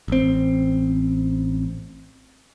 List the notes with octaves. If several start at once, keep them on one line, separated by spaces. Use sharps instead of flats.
A1 C4